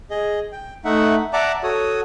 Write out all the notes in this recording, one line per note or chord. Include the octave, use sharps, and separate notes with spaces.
G#4 D#5
G5
A3 D#4 E5 F#5
D5 E5 F#5 A5 A#5 D6
F#4 A4 C#5 D#6